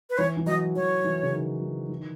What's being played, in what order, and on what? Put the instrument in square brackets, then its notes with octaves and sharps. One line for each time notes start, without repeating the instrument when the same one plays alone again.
[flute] B4
[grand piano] E3 [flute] C#5
[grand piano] E3
[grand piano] F#3 [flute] D#5
[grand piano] E3 [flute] C#5
[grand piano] E3
C#3
D#3
E3
E3
D#3